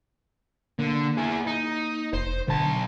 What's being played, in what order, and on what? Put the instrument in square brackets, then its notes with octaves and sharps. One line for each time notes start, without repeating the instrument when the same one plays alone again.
[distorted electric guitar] D3 [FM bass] A#3
[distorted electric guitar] E4 G#4
D#4
[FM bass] F1 [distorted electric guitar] C5
[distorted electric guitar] B1 A5 [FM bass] D3